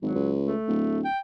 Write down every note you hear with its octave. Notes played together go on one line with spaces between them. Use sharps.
G#1 F#3
C#2
A3
D1
G5